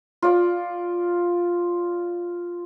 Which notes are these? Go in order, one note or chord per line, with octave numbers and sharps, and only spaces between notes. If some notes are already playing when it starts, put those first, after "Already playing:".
F4 D5